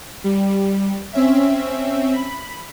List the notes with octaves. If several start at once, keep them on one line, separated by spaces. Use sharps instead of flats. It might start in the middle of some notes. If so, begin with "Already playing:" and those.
G3
C4 C#4 E5
B5